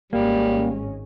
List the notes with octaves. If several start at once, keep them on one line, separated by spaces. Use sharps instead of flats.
G#1 G3 G#3 A#3 C#4